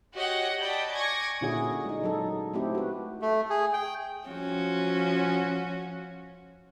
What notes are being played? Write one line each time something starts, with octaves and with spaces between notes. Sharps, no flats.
F#4 G4 C#5 D#5 F#5
D5 D#5 G5 A5 B5 G6
G#5 C#6 D6 G#6 A#6
A#2 D3 C#4 E4 F#4 G#4
G#3 D#4
F#3 D#4 A4
A3 C4 E4 G4
F#4 B4
A3
G#4
G5
F3 C#4 F#4